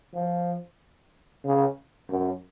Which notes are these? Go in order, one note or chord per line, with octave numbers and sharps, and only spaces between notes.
F3
C#3
F#2